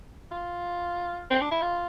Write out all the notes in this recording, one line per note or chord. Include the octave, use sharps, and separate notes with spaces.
F4
C4
D4
E4
F4